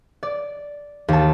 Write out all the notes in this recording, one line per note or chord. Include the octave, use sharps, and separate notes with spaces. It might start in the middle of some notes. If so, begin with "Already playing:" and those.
D5
D#2 A5